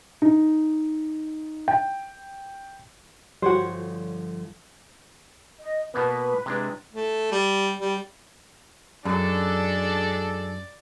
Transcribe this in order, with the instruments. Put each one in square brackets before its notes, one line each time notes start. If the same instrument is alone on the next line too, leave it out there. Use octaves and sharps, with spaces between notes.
[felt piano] D#4
G5
[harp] G1 F3 [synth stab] G3 F#4 [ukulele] C5 C#5 F#5
[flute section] D#5
[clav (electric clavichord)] B2 A#3 B3 [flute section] B4
[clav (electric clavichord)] C3 G#3 D4
[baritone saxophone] A3
G3
G3
[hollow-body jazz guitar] F#2 [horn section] G#3 D4 A4 [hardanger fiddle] D5